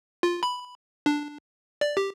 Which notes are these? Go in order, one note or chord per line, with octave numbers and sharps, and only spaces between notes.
F4
B5
D4
D5
G4